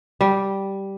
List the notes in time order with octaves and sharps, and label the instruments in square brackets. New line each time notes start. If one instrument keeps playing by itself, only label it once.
[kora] G3